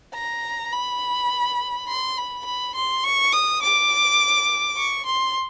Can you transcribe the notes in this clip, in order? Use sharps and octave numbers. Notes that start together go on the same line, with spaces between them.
A#5
B5
C6
B5
B5
C6
C#6
D#6
D6
C#6
C6